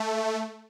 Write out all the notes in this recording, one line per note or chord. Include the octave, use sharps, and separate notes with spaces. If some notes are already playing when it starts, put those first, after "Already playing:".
Already playing: A3